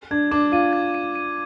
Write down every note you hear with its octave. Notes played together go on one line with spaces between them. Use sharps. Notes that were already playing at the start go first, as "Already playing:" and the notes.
D4 G#6
D4 D6
F4 D#7
G#6
D#7
D#7